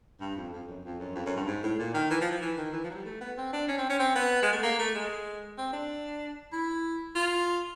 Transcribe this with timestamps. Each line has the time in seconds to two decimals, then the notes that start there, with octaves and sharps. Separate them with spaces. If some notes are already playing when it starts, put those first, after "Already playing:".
0.21 G2
0.37 F2
0.53 F2
0.68 F#2
0.84 F2
1.00 F#2
1.15 F2
1.26 F#2
1.36 G2
1.47 G#2
1.63 A2
1.79 A#2
1.94 D#3
2.10 E3
2.21 F3
2.32 F3
2.41 E3
2.58 D#3
2.73 E3
2.84 F3
2.90 F#3
2.94 G3
3.05 A3
3.21 B3
3.37 C4
3.53 D4
3.68 C#4
3.78 C4
3.89 C#4
3.99 C4
4.15 B3
4.42 G#3
4.52 A3
4.63 A#3
4.79 A3
4.95 G#3
5.58 C4
5.73 D4
6.53 E4
7.15 F4